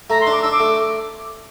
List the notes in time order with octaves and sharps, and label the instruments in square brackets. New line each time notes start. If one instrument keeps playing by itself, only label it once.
[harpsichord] A3 [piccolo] A#5
[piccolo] C6
[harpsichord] D4
[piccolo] D6
[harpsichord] D4 [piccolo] E6
[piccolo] D6
[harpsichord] A3